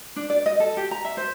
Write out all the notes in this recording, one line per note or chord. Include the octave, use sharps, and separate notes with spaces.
D4
D5
D#5
A4
G4
A#5
E5
C5